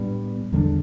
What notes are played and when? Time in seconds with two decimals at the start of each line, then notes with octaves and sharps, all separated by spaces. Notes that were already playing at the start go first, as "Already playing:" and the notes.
Already playing: A2 G3 B3 D4
0.53 E2 D3 G3 D4